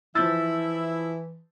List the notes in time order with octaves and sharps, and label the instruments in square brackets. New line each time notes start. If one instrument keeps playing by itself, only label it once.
[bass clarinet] E3 [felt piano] F3 G6 A6 [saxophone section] E4 [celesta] E6